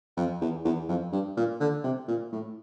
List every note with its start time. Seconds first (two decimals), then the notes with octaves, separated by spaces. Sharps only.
0.17 F2
0.41 E2
0.65 E2
0.88 F2
1.12 G2
1.37 A#2
1.60 D3
1.84 C3
2.08 A#2
2.32 A2